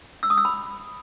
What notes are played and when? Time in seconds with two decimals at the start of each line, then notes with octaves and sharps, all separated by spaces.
0.23 E6
0.30 D#6
0.38 E6
0.45 B5